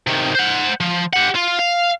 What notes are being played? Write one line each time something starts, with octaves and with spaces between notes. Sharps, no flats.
C3 D#3
C5 F#5
F3
G4 F#5
F4
F5